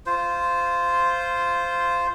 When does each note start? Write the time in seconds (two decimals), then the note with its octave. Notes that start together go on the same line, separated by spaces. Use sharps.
0.06 F4 C5